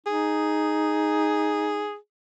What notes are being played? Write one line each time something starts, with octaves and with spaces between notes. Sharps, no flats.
D#4 G#4